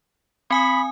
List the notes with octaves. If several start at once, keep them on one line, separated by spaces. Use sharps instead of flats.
C4 G#5 B5 D#6